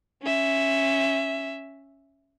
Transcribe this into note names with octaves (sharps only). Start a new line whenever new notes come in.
C#4 E5